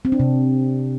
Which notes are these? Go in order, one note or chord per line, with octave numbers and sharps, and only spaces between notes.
C4
D4
C3